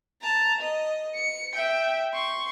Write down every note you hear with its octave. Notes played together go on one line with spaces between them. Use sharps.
A5 A#5
D#5
C#7
E5 G5
C6 C#6